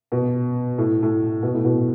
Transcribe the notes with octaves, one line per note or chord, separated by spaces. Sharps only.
B2
A2
A2
B2
A2
B2